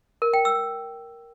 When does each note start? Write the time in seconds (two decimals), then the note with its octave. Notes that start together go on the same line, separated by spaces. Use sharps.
0.22 A#4
0.33 G5
0.45 E6